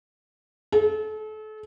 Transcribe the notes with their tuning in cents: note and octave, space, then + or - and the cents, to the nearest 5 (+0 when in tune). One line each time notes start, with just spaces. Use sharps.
A4 -35